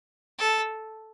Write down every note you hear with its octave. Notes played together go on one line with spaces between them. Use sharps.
A4